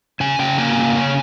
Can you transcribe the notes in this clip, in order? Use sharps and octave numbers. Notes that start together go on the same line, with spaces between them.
C#3 G#5
C#3 G5
A#3 G#5
C#3
C#4